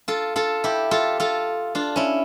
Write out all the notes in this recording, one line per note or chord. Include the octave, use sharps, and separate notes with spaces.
F4 A4
F4 A4
E4 G4
F4 A4
F4 A4
D4 F4
C#4 E4